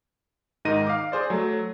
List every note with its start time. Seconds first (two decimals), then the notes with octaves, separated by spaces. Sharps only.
0.65 G#2 D#3 D#4 A#6 D#7
0.87 F5 D6
1.12 G#4 C5 D5
1.30 F#3 A3